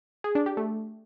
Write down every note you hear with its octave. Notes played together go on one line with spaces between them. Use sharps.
G#4
D4
G4
A3